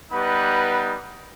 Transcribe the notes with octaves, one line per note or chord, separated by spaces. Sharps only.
G3 B3 D#4 B4